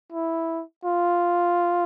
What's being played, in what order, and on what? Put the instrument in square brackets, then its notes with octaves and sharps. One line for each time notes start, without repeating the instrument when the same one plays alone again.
[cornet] E4
F4